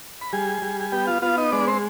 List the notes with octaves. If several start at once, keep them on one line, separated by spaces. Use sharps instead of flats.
B5
G3 G#4 G#5
G3
G#5
B3 G4 G5
F4 F5
B3 F4 F5
D#4 D#5
G#3 D4 D5
C4 C5